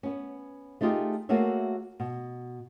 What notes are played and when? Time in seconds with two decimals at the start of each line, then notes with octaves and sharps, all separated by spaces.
0.03 B3 C#4
0.81 A3 D#4 F4 G4 G#4
1.29 A3 A#3 F#4 G#4 C#5 E5
2.00 B2